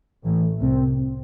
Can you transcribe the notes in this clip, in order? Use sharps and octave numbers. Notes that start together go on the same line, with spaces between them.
A1 A2 E3
A3
C2 C3 C4
C3
C4